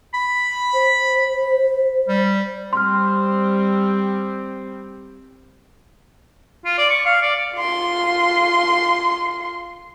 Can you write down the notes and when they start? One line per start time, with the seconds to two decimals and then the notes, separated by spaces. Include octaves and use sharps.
0.14 B5
0.74 C5
2.08 G3
2.73 G3 C4 C6 F6
6.65 F4
6.78 D5
6.90 C#6
7.06 F5
7.22 D5
7.56 F4 C6